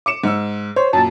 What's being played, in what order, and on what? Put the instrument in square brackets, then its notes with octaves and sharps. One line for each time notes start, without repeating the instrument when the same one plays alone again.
[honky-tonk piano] D6 C#7 E7
G#2 E6
[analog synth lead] C5 [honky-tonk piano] C#5
[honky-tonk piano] F#2 A#2 [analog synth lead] A5